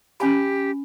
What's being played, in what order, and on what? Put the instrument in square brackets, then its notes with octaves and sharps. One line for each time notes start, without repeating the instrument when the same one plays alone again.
[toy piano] C#4 G#5 B5 [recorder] G4